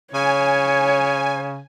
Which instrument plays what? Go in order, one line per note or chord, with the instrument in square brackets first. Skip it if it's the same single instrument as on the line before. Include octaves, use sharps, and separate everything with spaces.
[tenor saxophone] C#3 [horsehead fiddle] C#5 [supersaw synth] G#5